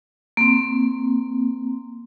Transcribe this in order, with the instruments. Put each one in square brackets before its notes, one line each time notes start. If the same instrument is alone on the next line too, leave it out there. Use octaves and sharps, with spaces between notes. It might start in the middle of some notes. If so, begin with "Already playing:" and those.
[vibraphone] A#3 C4